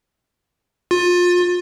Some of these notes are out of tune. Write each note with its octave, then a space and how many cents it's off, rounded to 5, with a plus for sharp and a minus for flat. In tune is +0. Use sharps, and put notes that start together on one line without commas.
F4 +25